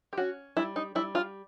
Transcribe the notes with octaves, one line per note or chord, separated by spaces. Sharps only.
G4
C#4 F#4
G3 E4
D#4
G3 E4
F4